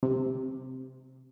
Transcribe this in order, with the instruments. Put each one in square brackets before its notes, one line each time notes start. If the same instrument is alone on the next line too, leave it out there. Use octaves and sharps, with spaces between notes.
[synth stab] C3